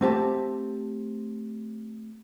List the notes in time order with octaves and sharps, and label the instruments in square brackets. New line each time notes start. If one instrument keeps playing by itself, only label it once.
[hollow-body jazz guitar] A3 C4 G4 A5